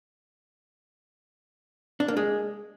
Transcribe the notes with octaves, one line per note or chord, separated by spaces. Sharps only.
D4
A#3
G#3